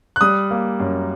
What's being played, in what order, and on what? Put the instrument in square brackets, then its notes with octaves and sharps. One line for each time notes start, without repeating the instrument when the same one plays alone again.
[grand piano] F#6
G3 D#6
A#3
F#2